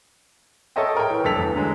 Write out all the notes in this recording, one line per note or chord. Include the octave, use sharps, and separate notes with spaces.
A4 A#4 C#5 D#5 E5 G5
G#4 A#4 C#5 G5
E3
F1 G2 A4 B6 F7
E2
D3 F#3 G#3